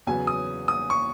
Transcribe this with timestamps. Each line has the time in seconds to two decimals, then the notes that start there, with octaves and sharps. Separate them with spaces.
0.07 E2 C#3 F#3 B3 G#5
0.27 D#6
0.68 D#6
0.90 C#6